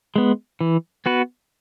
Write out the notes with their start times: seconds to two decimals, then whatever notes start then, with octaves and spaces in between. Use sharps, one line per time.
0.16 G#3 B3
0.61 E3
1.06 B3 F#4 B4